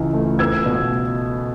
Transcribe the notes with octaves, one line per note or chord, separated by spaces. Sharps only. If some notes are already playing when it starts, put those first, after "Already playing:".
Already playing: C#2 C#3 E3
A3
B3 E6 G#6
B2